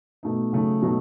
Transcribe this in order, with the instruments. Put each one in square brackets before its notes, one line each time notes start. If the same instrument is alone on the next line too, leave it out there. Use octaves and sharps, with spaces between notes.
[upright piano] B2 A3 D#4
C#3 F#3 A3 D#4
B2 F#3 A3 D#4